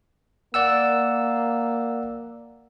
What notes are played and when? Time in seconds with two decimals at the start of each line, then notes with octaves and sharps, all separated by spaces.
0.54 A#3 D5 F#5 E6